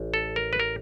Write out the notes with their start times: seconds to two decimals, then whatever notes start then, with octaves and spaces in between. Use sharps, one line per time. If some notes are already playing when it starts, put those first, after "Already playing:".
Already playing: A1
0.14 A4
0.36 A#4
0.53 B4
0.60 A#4